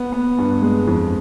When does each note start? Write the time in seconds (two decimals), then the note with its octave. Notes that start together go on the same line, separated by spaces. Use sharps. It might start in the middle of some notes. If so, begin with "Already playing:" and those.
Already playing: B3
0.13 B3
0.38 G2
0.62 G#3
0.87 F2